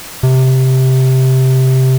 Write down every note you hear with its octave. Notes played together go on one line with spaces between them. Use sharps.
C3